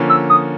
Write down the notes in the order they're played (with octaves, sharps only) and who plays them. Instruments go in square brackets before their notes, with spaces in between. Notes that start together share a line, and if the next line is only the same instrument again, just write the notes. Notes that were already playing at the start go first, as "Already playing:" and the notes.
Already playing: [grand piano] D3 F3 A#3 C#4
[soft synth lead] E6
D#6